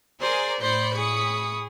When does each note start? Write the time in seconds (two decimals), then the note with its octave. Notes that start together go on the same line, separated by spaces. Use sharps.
0.21 G#4 A#4 C5 D5 G#5
0.61 A2 C5 D5 B5 G6 C#7
0.95 G#4 C#6 D#6